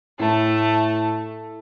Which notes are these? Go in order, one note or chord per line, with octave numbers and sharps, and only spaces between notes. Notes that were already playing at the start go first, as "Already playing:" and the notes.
A2 A3 A5